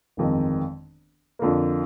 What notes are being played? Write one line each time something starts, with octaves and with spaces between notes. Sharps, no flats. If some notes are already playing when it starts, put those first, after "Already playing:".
G1 F2 D#3 G#3 C4
F2 D3 F3 A#3